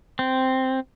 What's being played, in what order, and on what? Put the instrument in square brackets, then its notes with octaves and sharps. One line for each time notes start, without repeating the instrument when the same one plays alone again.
[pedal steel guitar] C4